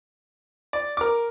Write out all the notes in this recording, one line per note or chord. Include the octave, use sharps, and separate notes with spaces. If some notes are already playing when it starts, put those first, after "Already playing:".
D5
A#4 D6